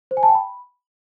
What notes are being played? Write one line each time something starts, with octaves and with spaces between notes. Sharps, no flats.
C5
G#5
A5
G5
B5